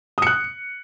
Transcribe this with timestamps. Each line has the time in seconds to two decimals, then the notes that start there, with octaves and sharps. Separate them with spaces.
0.18 D#6
0.22 C#7
0.27 F#6